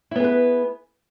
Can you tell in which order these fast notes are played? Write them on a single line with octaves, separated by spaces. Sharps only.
E4 B3 G#4 B4